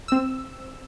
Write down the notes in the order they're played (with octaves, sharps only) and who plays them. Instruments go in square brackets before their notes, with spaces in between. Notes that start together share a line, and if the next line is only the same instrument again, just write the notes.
[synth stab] C4 E6